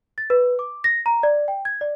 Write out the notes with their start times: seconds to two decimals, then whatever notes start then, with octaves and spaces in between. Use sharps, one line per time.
0.18 A6
0.30 B4
0.59 D6
0.84 A#6
1.06 A#5
1.23 D5
1.48 G5
1.65 G#6
1.81 D5